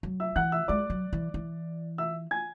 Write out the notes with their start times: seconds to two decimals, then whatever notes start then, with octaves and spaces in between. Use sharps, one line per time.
0.03 F#3
0.20 E5 E6
0.36 E3 F#5 F#6
0.52 E5 E6
0.68 G#3 D5 D6
0.90 F#3
1.13 E3
1.34 E3
1.98 E5 E6
2.31 G#5 G#6